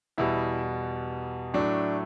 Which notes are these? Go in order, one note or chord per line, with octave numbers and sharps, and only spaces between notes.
E2 B2 G3 E4
A2 F#3 A3 D4